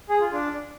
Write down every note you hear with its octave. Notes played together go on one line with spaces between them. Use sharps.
G#4
F4
D4